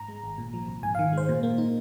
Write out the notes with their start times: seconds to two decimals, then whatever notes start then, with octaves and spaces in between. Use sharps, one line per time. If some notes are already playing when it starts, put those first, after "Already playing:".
Already playing: G#2 A#5
0.08 G#3
0.24 G#1
0.38 A#2
0.54 F3
0.68 C2
0.83 G#2 G#5
0.95 F5
0.99 D#3
1.13 G#3 C5
1.29 A#2
1.43 A#3
1.58 D#4